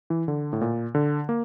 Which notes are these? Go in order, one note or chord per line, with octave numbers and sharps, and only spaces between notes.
E3
D3
A2
A#2
D3
A#3